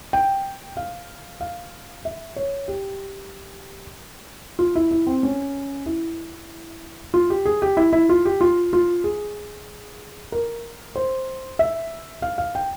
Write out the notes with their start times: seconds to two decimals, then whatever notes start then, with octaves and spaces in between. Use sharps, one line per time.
0.13 G5
0.77 F5
1.41 F5
2.05 E5
2.36 C#5
2.68 G4
4.59 F4
4.75 E4
4.91 E4
5.07 C4
5.23 C#4
5.86 E4
7.14 F4
7.30 G4
7.45 G#4
7.62 G4
7.77 E4
7.93 E4
8.09 F4
8.25 G4
8.41 F4
8.73 F4
9.04 G#4
10.32 A#4
10.96 C5
11.59 E5
12.22 F5
12.38 F5
12.55 G5